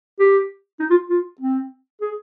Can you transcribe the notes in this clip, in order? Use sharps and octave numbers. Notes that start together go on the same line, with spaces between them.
G4
D#4
F4
F4
C4
G#4